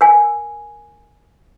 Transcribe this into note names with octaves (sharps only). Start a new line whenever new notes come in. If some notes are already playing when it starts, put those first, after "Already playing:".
A#4 G#5